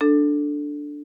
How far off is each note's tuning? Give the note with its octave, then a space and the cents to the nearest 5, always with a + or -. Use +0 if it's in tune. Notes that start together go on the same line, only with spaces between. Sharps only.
D4 +0 A4 +0